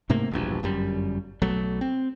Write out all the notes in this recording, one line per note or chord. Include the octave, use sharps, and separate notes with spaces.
G#2 C3 A3 A#3
E1 A#1 G2
G1 F#2 G3
B1 F#3 A3
C4